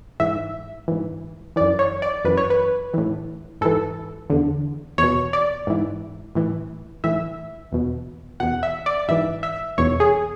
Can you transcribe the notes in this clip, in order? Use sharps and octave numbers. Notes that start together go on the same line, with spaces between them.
G#2 E3 E5
G#2 E3
F#2 E3 D5
C#5
D5
F#2 E3 B4
C#5
B4
A2 E3
G#2 E3 A4
E2 D3
E2 B2 C#5
D5
G#2 E3
A2 E3
A2 E3 E5
E2 B2
E2 B2 F#5
E5
D5
G#2 E3 E5
E5
E2 B2 C#5
G#4